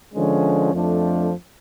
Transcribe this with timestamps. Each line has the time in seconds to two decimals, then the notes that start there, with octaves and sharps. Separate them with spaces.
0.14 D3 F3 G#3 C#4
0.73 F2 F3 A3 D4